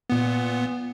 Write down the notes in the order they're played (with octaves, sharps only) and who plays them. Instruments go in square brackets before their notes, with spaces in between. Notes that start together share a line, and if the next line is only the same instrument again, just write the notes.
[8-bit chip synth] A#2 B3